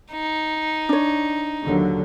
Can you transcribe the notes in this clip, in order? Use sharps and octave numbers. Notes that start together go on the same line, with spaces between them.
D#4
D4 C#5
D#2 D3 F#3